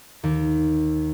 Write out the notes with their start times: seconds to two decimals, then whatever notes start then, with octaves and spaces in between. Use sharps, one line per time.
0.23 D#2